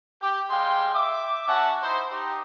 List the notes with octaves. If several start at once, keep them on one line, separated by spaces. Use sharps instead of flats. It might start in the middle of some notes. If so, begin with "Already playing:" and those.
G4
G3 G#3 F5 G5 C6
E5 D6
C#4 F#4 E5 F#5 A5
D#4 E4 C5
D#4 G4